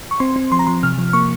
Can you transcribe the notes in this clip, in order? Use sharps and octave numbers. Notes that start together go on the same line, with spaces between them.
C#6
C4 C6
C4
F3 C6
A#5
F3 C6
C3 F6
F3
A#3 C#6